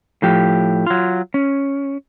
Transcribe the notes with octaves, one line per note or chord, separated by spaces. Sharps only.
A2 F3 G4
F#3 F4
C#4